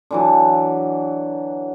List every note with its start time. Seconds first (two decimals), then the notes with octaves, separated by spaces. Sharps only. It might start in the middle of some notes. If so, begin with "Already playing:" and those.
0.11 D3 E3 F#3